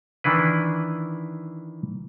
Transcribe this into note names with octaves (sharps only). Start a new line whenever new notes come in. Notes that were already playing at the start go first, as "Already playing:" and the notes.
D#3 E3 D4 E4 B4